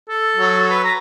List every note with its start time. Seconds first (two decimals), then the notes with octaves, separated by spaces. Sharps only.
0.09 A4
0.37 F#3
0.70 B4
0.84 A#5